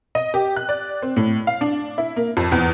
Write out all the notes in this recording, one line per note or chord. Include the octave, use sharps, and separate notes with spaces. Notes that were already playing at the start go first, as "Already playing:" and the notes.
D#5
G4
F#6
D5
C4
A2
F5
D4
E4
A#3
F2
E2